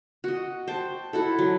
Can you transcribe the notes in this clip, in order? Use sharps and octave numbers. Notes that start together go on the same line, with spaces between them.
F#4 D#5
C5 G5 A5
E4 F#4 A4
F#3